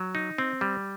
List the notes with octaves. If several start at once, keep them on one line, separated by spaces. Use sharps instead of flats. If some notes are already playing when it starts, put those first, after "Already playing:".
Already playing: F#3
D#4
C4
G3